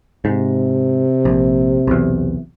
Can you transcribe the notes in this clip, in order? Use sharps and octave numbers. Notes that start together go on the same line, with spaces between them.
G#2 C3
A#1
B1 E2